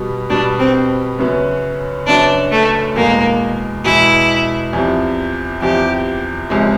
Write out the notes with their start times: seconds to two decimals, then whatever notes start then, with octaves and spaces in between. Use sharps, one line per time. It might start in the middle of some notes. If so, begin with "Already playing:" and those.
Already playing: B2 G3 B3
0.30 B2 G3 B3 D4
0.59 C4
1.19 F#2 C#3 F#3 B3
2.07 F#2 C#3 F#3 B3 D4
2.51 A3
2.96 E2 B2 G#3 A#3
3.85 E2 B2 G#3 E4
4.73 E2 C3 F3
5.62 E2 C3 F3 G4
6.50 C#2 C3 F3 G#3